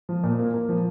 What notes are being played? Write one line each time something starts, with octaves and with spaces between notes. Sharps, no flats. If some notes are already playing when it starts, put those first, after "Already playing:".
F3
A#2
A#3
A#3
F3